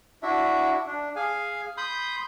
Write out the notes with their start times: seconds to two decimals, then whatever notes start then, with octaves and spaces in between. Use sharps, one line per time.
0.23 D4 E4 F#4 E5
0.86 D4
1.16 G#4 F5 G#5
1.77 B5 C6 D#6 G6